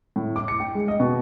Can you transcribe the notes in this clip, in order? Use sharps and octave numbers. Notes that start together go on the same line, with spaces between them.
A2
D6
C#7
G5
G#3
D#5
B2